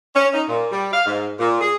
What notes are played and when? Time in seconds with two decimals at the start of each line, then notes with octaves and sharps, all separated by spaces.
0.15 C#4
0.34 D#4
0.49 A#2
0.72 G3
0.93 F5
1.06 G#2
1.39 A#2
1.61 G#4